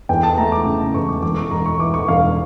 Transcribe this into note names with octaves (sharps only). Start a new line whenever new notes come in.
E2 G5
A5
A3 A#5
D6
C#3
A#5
E2 C#6
D6
E1 D6
C#6
E1 A#5
C#6
E3 D6
C#6
E1 F5